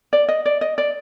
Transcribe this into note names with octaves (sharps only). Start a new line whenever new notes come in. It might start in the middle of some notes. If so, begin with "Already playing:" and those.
D5
D#5
D5
D#5
D5